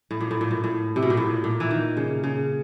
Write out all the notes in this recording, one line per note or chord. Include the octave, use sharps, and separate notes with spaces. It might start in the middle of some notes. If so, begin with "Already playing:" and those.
A2
A#2
A2
A#2
A2
A2
C3
B2
A#2
A2
A#2
E3
D#3
C#3
C#3